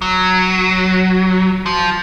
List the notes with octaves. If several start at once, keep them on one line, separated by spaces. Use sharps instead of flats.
F#3
F3